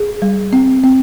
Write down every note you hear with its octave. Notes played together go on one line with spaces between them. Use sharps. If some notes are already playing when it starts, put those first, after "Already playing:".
Already playing: G#4
G3
C4
C4